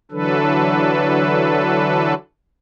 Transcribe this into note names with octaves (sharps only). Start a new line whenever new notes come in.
D3 E3 F#3 D4 A4 B4